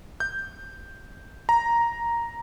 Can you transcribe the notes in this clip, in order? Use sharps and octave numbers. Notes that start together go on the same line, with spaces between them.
G6
A#5